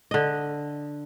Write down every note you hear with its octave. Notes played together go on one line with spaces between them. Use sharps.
D3 D#5